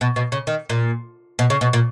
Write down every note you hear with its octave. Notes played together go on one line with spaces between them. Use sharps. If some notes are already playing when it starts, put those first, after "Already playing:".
B2
B2
C#3
D#3
A#2
B2
C#3
B2
A#2